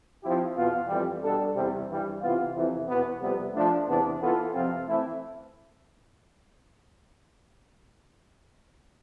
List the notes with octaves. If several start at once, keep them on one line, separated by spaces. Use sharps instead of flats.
F3 C4 E4 G4
E2 B2 B3 F4
F2 E3 G3
B2 G3 D4 A4
E2 C3 G3
G2 E3 G3
C3 E3 B3 F4
F2 C3 E3
E2 B2 B3
F2 C3 G3 B3
F3 A3 D4
E2 C3 E3 B3 D4
E3 B3 F4 A4
F2 C3 F3 C4 F4
E3 A3 C4 E4